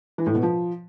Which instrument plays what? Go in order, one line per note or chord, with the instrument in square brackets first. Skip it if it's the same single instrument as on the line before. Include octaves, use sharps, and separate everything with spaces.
[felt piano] E3
A2
B2
F3